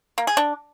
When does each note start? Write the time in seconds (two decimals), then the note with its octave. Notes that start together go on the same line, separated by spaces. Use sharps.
0.18 A#3
0.27 G#4
0.37 D4